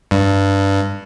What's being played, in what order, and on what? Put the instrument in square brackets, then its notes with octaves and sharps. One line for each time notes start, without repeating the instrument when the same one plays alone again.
[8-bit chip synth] G2